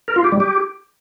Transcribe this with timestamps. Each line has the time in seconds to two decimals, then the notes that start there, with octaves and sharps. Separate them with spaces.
0.08 A#4
0.16 F4
0.24 G4
0.32 G3
0.40 G4